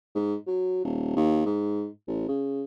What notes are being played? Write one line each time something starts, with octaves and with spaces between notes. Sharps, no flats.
G#2
F#3
D#1
D#2
G#2
A1
C#3